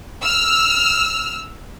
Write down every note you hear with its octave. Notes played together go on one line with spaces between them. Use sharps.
E6 F6